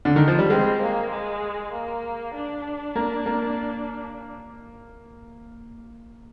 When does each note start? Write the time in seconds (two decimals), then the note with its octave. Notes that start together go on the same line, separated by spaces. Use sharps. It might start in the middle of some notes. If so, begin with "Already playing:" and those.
0.05 D3
0.16 D#3
0.28 F3
0.39 G3
0.50 G#3 C4
0.81 A#3
1.11 G#3
1.72 A#3
2.34 D4
2.96 A#3
3.26 A#3